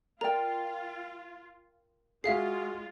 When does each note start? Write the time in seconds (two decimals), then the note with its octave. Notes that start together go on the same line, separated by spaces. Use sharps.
0.21 F4 A#4 D5 G5 A#5
2.24 G#3 F4 F#4 G#4 E5 F5 C7